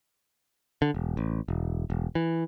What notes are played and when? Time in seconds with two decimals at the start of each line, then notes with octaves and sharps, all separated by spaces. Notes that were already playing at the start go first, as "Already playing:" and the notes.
0.82 D3
0.94 E1
1.17 A1
1.48 E1
1.90 E1
2.15 E3